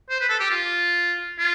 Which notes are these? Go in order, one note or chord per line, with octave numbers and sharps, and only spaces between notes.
C5
B4
A4
G4
F4
F4